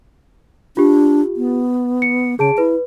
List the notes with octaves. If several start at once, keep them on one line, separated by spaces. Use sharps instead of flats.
D4 F4 G4
B3
C#7
C#3 G#4 A5 D7
E4 B4